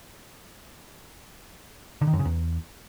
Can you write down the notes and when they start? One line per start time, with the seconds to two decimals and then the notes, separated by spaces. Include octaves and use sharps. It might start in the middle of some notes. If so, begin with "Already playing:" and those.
2.01 D3
2.07 D#3
2.13 F#2
2.19 C#3
2.25 E2